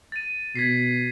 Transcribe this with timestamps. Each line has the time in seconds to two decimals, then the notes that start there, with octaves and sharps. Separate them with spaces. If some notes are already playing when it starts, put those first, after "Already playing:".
0.12 A6 D#7
0.55 B2 G#6 B6 C7